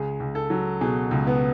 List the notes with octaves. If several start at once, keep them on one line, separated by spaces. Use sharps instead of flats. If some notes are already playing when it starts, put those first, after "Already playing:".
Already playing: C#2 G#4
C#2
A4
F#3
B2 G#4
C#2
B3